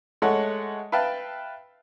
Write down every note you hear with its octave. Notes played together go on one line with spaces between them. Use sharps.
G#3 A3 A4 C#5 F#5
B4 E5 F5 G5 A5